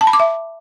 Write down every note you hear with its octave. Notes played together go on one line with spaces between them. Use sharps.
A5
B5
D6
E5